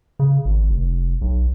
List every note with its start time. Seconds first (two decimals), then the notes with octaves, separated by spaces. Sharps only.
0.19 C#3
0.45 G#1
0.70 F1
1.21 B1